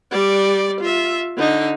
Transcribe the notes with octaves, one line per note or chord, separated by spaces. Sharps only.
G3 D5
F4 E5
D3 D#4